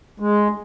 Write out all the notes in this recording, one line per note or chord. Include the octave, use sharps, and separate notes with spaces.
G#3